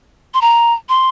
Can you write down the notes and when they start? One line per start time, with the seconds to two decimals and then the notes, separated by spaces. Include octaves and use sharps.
0.34 C6
0.41 A#5
0.89 C6